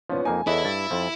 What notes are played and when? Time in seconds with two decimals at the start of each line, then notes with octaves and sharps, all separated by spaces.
0.10 A#2 F3 B3 C#4
0.25 F2 A#3 D#4 G#5
0.47 E2 E4 A4 C#5 D#5 F#5
0.65 G2 A6
0.91 F2 F3